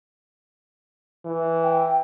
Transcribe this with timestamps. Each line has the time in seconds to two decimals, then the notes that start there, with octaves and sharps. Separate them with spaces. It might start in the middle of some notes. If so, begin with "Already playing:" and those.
1.25 E3
1.63 G5